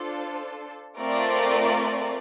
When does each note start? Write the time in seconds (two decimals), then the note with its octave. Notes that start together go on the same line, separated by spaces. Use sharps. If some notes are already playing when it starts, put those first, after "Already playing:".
Already playing: D4 F4 A4 C5
0.98 A3 C4 F4 A#4 D5